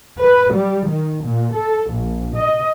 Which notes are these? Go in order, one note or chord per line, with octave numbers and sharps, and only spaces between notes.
B4
G3
D#3
A#2
A4
A#1
D#5